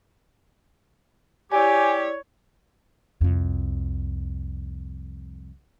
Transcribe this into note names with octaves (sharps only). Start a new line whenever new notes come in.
E4 G4 C#5 D5 G#5
C2 F2